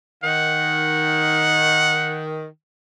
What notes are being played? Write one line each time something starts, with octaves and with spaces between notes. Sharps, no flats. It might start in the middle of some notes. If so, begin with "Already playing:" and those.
D#3 F#5